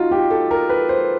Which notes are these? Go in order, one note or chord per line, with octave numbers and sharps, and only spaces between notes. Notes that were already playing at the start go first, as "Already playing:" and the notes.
Already playing: D#4 F4 F#4
G4
A4
A#4
B4
C5